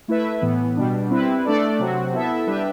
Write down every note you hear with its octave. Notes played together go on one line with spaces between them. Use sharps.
A3 E4 B4 E5
A2 E3 B3
B2 G3 D4
G3 C4 E4 B4
A3 D4 A4 D5
C3 F#3 C4 F#4
B3 E4 A4 E5
G3 D4 G4 B4 E5